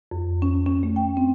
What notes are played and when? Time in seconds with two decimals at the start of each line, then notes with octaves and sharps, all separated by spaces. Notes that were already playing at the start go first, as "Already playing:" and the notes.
0.11 F2
0.42 C#4
0.66 C#4
0.83 A3
0.96 G5
1.17 C4